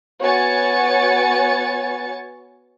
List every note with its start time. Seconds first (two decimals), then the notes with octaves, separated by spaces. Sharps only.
0.20 B3 F#4 C#5 G#5 A6 C#7